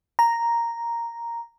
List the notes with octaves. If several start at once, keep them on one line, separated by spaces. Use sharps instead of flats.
A#5